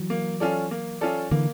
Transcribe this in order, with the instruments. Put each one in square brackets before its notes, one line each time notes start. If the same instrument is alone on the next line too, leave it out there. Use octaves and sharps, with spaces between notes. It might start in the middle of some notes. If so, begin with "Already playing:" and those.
Already playing: [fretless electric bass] E3 F#3
[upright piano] A#3
C#4 F4 A4 D5
A#3
C#4 F4 A4 D5
[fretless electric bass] D3 E3 [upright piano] A#3